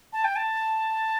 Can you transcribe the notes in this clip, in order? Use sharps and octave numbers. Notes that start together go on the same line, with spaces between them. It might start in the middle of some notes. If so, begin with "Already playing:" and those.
A5
G5
A5